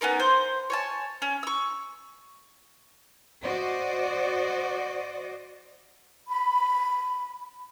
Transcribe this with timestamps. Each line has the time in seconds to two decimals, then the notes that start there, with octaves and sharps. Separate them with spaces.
0.01 B3 C#4 D#4 A#4
0.20 C5
0.70 C#5 G#5 A5
1.22 C#4
1.43 C#6 E6
3.43 F#4 C5 D5 D#5
6.28 B5